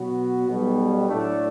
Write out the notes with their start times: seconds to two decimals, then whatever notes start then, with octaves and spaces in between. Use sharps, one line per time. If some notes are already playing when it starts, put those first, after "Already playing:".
Already playing: B2 F#3 B3 F#4
0.48 B1 B2 G3
1.08 A2 F#3 A3 D4